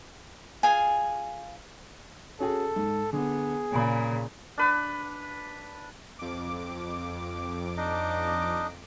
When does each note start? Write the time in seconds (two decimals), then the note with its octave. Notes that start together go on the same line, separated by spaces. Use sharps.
0.63 F4 G#4 G#5
2.40 C#4 F#4 G#4 A4
2.76 G#2
3.13 D3 B3 G#4
3.72 A#2 C#3 G#5 B5
4.58 D4 B4
6.19 F2 D6
7.77 D4 D#4 D#5